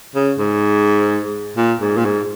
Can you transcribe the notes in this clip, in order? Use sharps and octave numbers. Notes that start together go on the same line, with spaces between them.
C#3
G#2
A#2
G#2
A#2
G#2